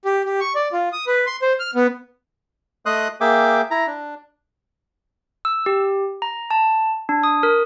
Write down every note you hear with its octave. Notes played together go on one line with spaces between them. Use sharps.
G4
G4
C#6
D5
F4
D#6
B4
C6
C5
F6
B3
A3 D#5 C6 D#6 F#6
A#3 G#4 E5 G5 D6
E4 A#5
D4
E6
G4
A#5
A5
D4
D#6
A#4